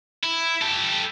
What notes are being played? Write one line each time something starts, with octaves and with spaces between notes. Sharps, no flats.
E4
G4 A4